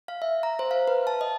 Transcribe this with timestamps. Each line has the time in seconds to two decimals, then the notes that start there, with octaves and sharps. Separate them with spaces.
0.08 F5
0.22 E5
0.43 A#5
0.59 C5
0.71 F5
0.88 B4
1.07 A5
1.21 D#5